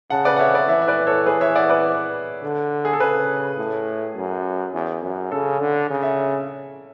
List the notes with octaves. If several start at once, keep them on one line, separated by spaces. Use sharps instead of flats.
C#3 F#5 A5
B4 D5
F#5
C#5 E5
B4 D5
E3 C#5 E5
E5
B4 D5
A4 C#5
G#4 B4
C#5 E5
D5 F#5
B4 D5
D3
G#4
A4
C#3 G#4 B4
A2
F#2
E2
F#2
C#3 A4
D3
C#3
E5